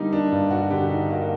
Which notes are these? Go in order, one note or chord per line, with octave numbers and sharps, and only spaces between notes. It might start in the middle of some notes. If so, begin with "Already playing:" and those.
Already playing: D3 G3 A#3 D#4 G4
D4
G2
F#4
D3 G4
D#4
A#3 F#4